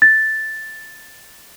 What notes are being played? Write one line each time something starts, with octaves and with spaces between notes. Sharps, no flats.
A6